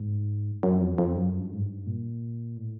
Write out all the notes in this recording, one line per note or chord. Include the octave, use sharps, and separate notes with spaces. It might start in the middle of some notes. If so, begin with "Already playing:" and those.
Already playing: G#2
F#2
F2
F2
F#2
G2
G#2
G2
A#2
A2